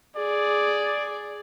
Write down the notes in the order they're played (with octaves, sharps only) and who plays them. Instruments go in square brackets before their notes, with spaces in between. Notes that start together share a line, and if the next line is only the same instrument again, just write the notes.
[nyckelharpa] G#4 [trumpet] D5